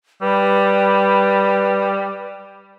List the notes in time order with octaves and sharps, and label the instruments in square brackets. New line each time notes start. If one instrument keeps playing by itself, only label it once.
[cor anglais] G3 [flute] B4